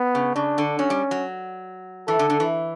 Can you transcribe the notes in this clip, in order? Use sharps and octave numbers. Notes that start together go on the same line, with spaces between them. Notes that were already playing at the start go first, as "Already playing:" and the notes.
Already playing: B3
C#3
C#3 D4
D3
F#3 C#4
G3
F#3
E3 A4
D3
D3
E3